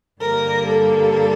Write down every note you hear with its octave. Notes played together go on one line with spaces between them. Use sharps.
G2 D3 G3 A#3 A#4
A4